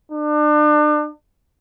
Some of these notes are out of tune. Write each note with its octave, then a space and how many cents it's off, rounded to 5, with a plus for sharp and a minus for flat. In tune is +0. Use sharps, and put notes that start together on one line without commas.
D4 +35